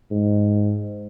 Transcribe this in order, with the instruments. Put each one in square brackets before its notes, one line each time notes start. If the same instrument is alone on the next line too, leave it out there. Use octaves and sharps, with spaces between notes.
[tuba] G#2